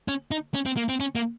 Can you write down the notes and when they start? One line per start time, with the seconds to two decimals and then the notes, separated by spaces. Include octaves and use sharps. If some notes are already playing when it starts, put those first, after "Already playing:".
0.08 C#4
0.31 D#4
0.54 C#4
0.66 C4
0.77 A#3
0.89 C4
1.00 C#4
1.15 A#3